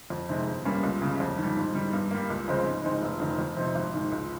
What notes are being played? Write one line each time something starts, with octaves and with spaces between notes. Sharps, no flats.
F2
C3 D#3 G#3
G1
G2 G3 A#3 C#4
C#2
C#3 G3
F2
D#3 G3
G#2
D#3 G3
G2
G3 A#3
C#2
C#3 F3 G#3 C4
G#2
D#3 G#3 C4 D#4
F1
F2 D#3
F2
C3 F3 C4 D#4
G#1
G#2 D#3 G#3
C#2